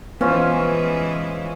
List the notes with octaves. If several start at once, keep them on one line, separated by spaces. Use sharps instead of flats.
E3 F3 G#3 B3 C#4